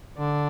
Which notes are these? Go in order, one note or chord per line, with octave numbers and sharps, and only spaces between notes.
D3 D4